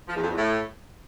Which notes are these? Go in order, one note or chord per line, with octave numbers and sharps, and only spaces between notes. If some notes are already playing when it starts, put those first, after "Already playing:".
F3
E2
F2
E2
A2